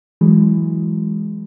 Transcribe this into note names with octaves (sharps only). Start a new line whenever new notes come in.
E3 F#3 G#3